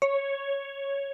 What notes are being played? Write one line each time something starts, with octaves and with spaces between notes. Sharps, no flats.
C#5